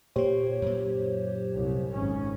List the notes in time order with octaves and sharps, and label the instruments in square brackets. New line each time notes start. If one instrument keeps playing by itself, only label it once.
[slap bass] A#2 A#3 [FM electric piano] G4 C5 C#5
[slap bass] F#2 A#2
[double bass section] C2
G#1 G#2 C#4